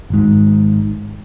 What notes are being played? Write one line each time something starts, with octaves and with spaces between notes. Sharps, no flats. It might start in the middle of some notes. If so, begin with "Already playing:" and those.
G#1 G#2